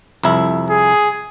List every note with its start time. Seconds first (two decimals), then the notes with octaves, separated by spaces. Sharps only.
0.24 C2 F2 E4
0.70 G#4